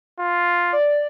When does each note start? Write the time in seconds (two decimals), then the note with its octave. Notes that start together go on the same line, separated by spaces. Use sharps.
0.19 F4
0.73 D5